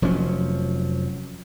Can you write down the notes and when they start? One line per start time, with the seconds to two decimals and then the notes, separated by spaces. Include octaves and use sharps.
0.02 F1 F3 F#3 C#4